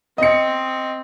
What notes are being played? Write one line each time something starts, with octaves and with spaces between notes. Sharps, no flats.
C4 D#5 C#7